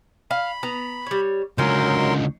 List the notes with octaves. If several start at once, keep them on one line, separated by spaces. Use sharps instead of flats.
F5 B5
B3 A#5
G3 C#5
C#2 D3 F#3 C#4 D#4 A#4 C6